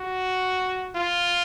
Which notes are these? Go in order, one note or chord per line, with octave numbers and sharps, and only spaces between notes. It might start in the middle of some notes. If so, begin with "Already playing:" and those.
Already playing: F#4
F4